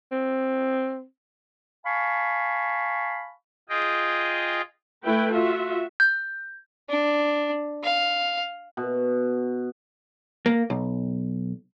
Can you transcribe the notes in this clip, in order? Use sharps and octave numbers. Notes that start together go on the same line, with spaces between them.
C4
F5 G#5 A5 B5 C#6
F4 G#4 D#5 G5
A3 E4 B4 G5
F4 F#4 E5
G6
D4
F5
B2
A#3
B1